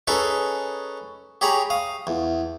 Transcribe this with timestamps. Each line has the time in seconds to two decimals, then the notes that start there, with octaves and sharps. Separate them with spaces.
0.08 C#4 D#4 G#4 A4 B4 C#5
1.41 G4 G#4 C#5 A#5 B5
1.70 F5 D#6
2.07 E2